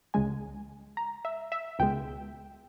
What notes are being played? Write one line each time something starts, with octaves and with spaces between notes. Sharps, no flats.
C#2 C#3 G#3 G#5
A#5
E5
E5
C#2 B2 G#3 G5